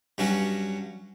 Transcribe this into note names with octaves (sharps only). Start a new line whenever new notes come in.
G2 F#3 C#4 F#4